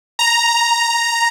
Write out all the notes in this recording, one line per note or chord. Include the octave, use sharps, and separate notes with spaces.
A#5